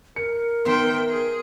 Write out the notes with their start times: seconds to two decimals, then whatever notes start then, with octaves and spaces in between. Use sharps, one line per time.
0.16 A#4 C#7
0.65 D#3 B3 C5 E5 G5 C6
1.10 G#4